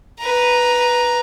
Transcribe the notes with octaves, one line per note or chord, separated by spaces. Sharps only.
B4 A#5